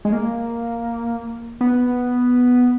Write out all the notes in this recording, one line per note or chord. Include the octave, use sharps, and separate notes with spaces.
G#3
A#3
B3